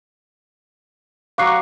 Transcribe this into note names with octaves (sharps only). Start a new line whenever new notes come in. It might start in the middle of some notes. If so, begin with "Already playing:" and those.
F#3 F5 C#6 D6 F#6 C7